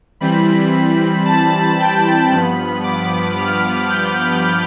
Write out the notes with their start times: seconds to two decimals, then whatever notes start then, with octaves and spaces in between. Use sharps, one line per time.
0.21 E3 G3 C4 B5
1.25 A5
1.79 G5
2.31 G2 F3 B3 B5
2.83 D6
3.37 F6
3.89 G6